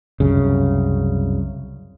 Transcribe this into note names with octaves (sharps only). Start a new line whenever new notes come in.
C2 F#2 C#3